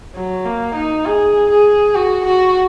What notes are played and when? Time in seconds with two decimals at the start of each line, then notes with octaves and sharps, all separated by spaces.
0.16 F#3
0.45 A#3
0.75 D#4
1.06 G#4
1.51 G#4
1.95 F#4
2.25 F#4